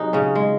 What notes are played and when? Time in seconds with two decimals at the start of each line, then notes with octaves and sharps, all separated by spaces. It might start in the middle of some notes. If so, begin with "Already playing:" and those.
Already playing: C3 F#3 D#4 F#4 G#4
0.13 C#3 C#4
0.35 G#3